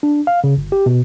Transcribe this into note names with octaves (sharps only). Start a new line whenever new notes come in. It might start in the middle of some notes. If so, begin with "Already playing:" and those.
D4
F5
C#3
G1
G4
B2